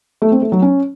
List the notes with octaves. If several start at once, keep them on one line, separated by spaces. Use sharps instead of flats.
A3
C4
A3
F#3
C#4